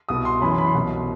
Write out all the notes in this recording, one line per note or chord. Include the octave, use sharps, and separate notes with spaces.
C2 B2 D#6
C6
F#2 E3 B5
C6
B5
C6
C2 B2